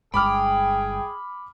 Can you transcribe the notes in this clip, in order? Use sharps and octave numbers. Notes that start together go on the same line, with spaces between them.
G1 G2 G#3 G#4 G5 B5 D6 F6